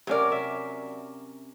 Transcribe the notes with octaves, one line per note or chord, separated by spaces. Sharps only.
C3 F#3 C#4 A#4 D5
E5